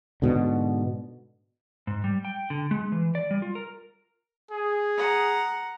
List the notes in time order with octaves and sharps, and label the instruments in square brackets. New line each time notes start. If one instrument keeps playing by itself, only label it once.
[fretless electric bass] G#2 B2 D3
[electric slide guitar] G#2
G3
G5
D3
G#3
E3
D5
G3
F4
A#4
[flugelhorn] G#4
[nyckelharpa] F#5 A#5